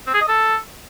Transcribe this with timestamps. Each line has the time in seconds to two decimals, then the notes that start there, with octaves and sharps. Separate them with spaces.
0.06 C4
0.14 G#4
0.21 D#5
0.28 A4